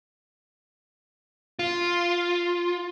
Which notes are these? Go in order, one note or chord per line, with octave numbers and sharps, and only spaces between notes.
F4